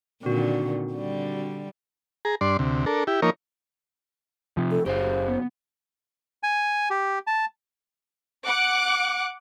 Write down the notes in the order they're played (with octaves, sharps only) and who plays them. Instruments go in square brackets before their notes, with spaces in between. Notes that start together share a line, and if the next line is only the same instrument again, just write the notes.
[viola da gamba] A#2 D3 D#3 [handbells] C4 F#4
[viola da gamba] D3 G3
[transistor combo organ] G#4 A#5
G2 D4 D5 C6
D2 C3
D4 A4 A#4
E4 G4
F3 A#3 D#4 A#4 C#5
[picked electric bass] C3 F3
[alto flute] A4
[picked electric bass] F#1 [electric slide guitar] G4 G#4 F5 [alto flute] C5
[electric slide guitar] B3
[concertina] G#5
G4
A5
[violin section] F#5 D6 F#6